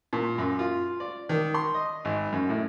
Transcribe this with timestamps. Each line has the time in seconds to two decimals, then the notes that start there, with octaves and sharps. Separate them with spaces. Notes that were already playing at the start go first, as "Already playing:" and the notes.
0.13 A#2
0.38 F#2
0.59 F4
1.00 D5
1.29 D#3
1.54 C6
1.74 D#5
2.05 G#1
2.32 F#2
2.49 A2